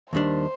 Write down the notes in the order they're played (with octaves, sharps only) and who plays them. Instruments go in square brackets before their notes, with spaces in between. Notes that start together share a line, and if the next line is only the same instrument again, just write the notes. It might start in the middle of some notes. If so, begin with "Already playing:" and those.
[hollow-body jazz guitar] D#2 D#3 G3 D4 [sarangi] C5